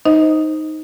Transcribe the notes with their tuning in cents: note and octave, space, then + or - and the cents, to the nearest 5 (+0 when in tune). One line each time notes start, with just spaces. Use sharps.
D#4 +0 C5 +5 D#5 +25